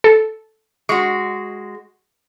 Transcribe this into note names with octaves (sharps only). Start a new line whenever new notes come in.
A4
G#3 F#4 C#6